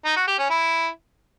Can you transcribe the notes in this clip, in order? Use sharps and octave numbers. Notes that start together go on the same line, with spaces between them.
D#4
F#4
G4
C#4
E4